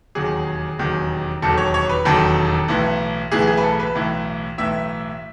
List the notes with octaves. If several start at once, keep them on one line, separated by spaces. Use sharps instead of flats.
E1 D#2 D#3 F#3 G#4
E1 D#2 D#3 F#3
E1 D#2 D#3 F#3 A4
C#5
C#5
B4
E1 D#2 D#3 F#3 A4
B1 A2 E3
B1 A2 E3 G#4
G#4
B4
A4
B4
B1 A2 E3
B1 A2 E3 E5